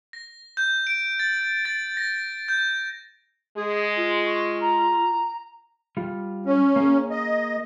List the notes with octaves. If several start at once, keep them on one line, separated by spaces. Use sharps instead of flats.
A#6
G6
D7
A6
A6
A#6
G6
G#3 G#4
F4
C#6
A#5
G3 F4
C#4
A#3 G#4
D#5